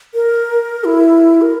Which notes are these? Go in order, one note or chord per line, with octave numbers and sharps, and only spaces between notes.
A#4
E4
A#4